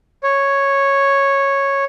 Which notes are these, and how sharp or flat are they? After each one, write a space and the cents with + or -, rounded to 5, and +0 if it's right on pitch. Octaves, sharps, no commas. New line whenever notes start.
C#5 -5